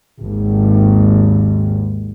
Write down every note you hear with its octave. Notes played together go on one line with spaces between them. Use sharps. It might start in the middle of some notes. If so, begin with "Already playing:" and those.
G#1 D#2